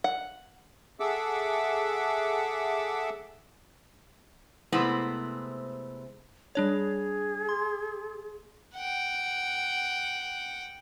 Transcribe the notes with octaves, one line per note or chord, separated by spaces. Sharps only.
F#5
G#4 A4 E5 F#5 D6 E6
C3 G#3 A3 B3 C4 E4
G3 D4 G#4 C#5
C6
F#5 G5